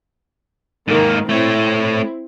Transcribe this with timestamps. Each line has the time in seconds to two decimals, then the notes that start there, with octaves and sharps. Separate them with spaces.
0.88 G#2 D#3 A#3
1.29 A3 C4 E4 C#5